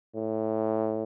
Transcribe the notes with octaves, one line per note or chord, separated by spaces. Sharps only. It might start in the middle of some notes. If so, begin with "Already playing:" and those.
A2